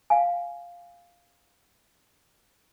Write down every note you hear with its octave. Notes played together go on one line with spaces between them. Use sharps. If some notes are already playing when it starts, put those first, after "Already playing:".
F5 G#5